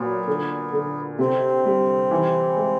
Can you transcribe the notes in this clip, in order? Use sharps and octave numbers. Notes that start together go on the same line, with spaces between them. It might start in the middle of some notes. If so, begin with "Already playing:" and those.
Already playing: A#2 F#3 B3
D3
D3
C3 C4
G3
E3
G#3